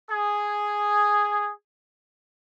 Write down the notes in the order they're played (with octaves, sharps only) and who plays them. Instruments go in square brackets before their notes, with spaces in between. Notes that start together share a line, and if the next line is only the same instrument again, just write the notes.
[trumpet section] G#4